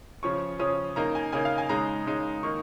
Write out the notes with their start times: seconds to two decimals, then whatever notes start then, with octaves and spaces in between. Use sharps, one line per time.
0.23 C#3 F3 C#4 C#6
0.59 C#3 F3 C#4 D#6
0.96 C#3 A#3 D#4 A#5
1.15 G#5
1.32 C#3 A#3 D#4 G#5
1.45 F5
1.58 G#5
1.69 C#3 G#3 D#4 A#5
2.06 C#3 G#3 D#4
2.43 D#3 A#3 D#4 C#6